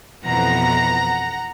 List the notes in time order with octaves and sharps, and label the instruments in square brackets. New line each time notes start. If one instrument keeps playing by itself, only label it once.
[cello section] F2 B2 E3 [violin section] F#5 A#5